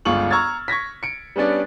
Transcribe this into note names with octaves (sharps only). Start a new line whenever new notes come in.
G1 C#2 F4 C#6 F#7
A#5 C#6 E6 F6 G#6 A6
C#6 G#6 A#6 B6
C#7 D7
G3 B3 C#4 D4 D5